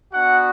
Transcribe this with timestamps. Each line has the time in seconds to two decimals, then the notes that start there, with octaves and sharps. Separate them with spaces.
0.13 B3 D4 F#4 F#5